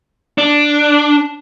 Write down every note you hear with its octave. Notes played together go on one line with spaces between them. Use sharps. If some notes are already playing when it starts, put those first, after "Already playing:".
D4